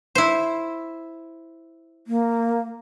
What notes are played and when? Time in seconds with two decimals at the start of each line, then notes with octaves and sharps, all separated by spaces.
0.15 E4 C5
2.07 A#3